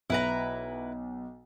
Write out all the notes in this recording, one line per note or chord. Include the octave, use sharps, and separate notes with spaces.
B1 E4 B4 A#5